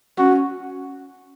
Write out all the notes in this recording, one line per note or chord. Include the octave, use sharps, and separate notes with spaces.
C#4 F#4